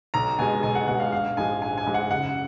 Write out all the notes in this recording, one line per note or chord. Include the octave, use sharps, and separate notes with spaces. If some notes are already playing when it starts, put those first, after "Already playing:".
B1 A#5
B2 G#3 G#5
B1 G#5
F#5
B2 G#3 F#5
F5
A#1 F5
G#2 F3 G#3 G#5
A#1 G#5
G#5
G#2 F3 G#3
F#5
F#1 F#5